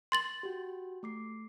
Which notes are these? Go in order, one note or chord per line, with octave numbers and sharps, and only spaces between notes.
C6 A6 F#7
F#4 G4
A3 D6 C7